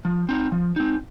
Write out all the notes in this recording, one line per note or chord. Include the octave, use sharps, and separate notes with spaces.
F3
C4 D#4
F3
C4 D#4